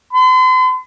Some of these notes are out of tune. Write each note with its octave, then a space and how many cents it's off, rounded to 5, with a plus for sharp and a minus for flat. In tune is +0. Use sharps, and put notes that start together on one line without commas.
C6 -40